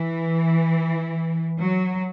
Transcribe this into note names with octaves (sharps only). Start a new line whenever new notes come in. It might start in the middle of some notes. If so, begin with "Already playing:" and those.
Already playing: E3
F#3